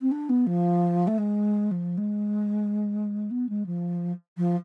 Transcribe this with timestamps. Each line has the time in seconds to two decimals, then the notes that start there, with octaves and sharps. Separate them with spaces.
0.02 C4
0.12 D4
0.29 B3
0.47 F3
1.07 A3
1.18 G#3
1.71 F3
1.98 G#3
3.31 B3
3.49 G#3
3.66 F3
4.37 F3